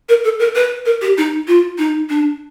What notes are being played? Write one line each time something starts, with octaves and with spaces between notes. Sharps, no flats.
A#4
A4
A#4
B4
A#4
G4
D#4
F4
D#4
D4